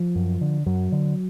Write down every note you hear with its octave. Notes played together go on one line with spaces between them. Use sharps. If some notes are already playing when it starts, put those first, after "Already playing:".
Already playing: F3
F#2
D3
F#2 F#3
D3